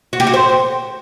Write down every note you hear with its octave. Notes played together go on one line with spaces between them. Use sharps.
F#4
G4
F#4
C5